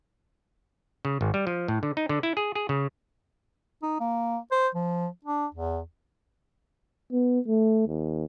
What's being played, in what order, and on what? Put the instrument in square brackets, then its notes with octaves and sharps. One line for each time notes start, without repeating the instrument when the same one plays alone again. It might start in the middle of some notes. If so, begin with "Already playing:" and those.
[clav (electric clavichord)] C#3
G#1
G3
F3
A2
D3
D#4
D3
E4
G#4
G#4
C#3
[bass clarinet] D#4
A#3
C5
F3
D4
E2
[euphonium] B3
A3
D#2